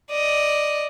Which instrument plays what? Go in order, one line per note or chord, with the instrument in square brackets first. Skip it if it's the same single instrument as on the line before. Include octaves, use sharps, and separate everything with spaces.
[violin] D5 D#5